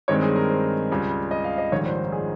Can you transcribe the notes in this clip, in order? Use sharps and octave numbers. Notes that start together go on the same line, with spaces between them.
G2 D#3 G#3 C4 C#5
G#4
A#4
C5
C#2 C#3 G3
D#5
F5
D#5
A#1 G#2 D#3 G3 C#5
C5
G#4